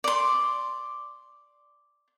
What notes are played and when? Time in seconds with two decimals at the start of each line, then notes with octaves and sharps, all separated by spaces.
0.04 D5 C6